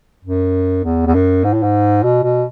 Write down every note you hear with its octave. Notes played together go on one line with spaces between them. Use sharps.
F#2
E2
E2
F#2
G#2
A2
G#2
B2
B2